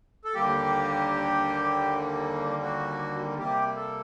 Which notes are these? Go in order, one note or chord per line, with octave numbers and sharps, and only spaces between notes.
A4
D#2 D3 G3 A#3 G4
F#4
C3 G3 A#3 G4
A4